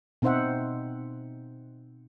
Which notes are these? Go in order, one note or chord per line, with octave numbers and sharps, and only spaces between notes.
B2 C4 D#4 C5 E5 F#5